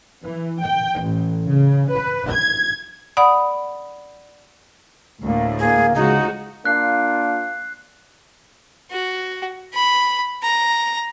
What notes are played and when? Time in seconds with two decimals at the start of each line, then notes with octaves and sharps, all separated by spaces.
0.24 E3
0.63 G5
1.03 A1
1.51 C#3
1.92 B4
2.32 G#6
3.17 D5 F#5 B5 D#6
5.23 D2 A2 A#3
5.59 A#3 G#4
5.95 C#3 F3 G#3 D#4 F#4
6.65 A#3 D4 F4 F#6 C7
8.91 F#4
9.74 B5
10.42 A#5